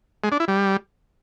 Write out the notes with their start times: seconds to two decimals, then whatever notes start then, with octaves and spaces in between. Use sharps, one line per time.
0.24 G#3
0.32 D4
0.40 E4
0.48 G3